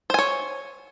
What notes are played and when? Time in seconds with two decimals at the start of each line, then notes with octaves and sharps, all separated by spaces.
0.10 C5
0.14 G#5
0.19 C#5